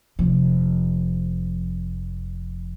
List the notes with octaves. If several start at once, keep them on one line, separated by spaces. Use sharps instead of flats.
F1 F3